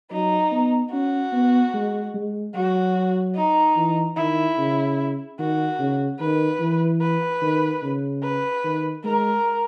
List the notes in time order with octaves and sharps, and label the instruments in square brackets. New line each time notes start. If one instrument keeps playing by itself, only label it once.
[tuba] F#3 [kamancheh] D#4
[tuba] B3
[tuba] C#4 [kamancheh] F#4
[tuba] B3
G#3
G#3
[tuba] F#3 [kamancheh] F#4
[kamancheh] D#4
[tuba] E3
[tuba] D#3 [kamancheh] E4
[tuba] C#3
[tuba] D#3 [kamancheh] F#4
[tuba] C#3
[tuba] D#3 [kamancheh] B4
[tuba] E3
[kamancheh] B4
[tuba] D#3
C#3
[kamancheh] B4
[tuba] D#3
[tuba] G#3 [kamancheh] A#4